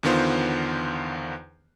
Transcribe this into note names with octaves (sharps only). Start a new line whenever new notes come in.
E2 D3 D#3 B3 F4 C5